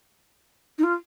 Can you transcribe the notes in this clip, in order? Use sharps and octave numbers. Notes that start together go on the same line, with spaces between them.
D#4
F4